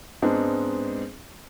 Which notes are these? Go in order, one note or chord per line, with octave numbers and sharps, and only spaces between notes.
G#2 G#3 B3 C4 D4